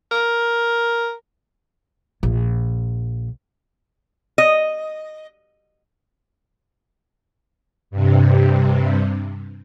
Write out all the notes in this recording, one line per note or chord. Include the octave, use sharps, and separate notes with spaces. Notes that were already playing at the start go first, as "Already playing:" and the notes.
A#4
A#1
D#5
G2 C3